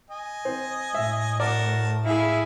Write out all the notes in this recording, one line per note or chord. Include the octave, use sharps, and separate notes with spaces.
D#5 G#5
C4
A2 E5
F#4 A#4 D5 A5
E4 G#4 E5 F5